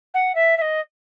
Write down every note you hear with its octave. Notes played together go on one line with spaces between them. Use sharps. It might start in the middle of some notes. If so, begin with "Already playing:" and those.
F#5
E5
E5
D#5